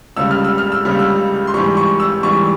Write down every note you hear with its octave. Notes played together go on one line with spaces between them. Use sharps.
C#2 C#3 G3 E6
F6
E6
F6
E6
C#2 C#3 G3 F6
E6
C6
G#2 E3 G3 C#6
C#6
E6
G#2 E3 G3 C#6